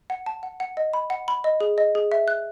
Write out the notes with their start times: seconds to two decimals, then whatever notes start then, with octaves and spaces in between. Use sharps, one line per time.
0.10 F#5
0.26 A5
0.43 F#5
0.60 F#5
0.77 D#5
0.93 B5
1.10 F#5
1.28 B5
1.44 D#5
1.61 G#4
1.78 D#5
1.95 G#4
2.12 E5
2.28 F#6